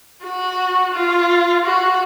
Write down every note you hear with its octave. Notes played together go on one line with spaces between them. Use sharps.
F#4
F4
F#4